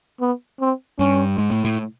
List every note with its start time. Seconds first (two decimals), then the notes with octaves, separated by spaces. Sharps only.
0.21 B3
0.60 C4
0.99 G2 C#4
1.38 G#2
1.51 A2
1.65 A2